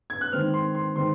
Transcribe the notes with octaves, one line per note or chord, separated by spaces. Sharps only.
G#6
F#6
D#3 G#3 C4 F6
C6
C6
D#3 G#3 C4 C6